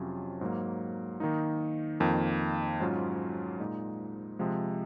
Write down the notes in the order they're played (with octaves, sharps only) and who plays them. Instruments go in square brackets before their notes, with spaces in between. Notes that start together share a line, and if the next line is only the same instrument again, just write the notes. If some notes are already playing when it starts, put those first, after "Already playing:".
Already playing: [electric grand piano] F2 C3 F#3 C#4 F4
G#2 F#3 A#3
D#3 A#3 D#4
F2 D#3 A#3
G#2 F#3 C#4 F4
A#2 G#3 D#4
C3 F3 G#3